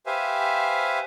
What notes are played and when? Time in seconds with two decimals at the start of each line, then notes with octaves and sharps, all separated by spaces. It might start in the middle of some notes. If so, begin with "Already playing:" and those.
0.06 G4 B4 C5 E5 F5 G#5